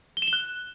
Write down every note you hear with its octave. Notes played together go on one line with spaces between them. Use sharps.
G7
E7
G7
F#6